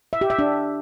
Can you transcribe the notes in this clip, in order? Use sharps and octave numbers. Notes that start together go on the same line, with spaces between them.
E5
G4
E5
D4